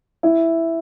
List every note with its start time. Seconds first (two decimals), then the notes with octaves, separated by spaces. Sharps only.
0.23 E4